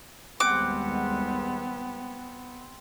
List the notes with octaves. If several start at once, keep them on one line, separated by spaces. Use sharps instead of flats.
D#2 G3 G#3 B3 C4 C5 F#5 D6